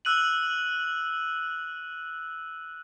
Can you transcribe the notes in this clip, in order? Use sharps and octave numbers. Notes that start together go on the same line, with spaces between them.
E6 F#6 D#7 F#7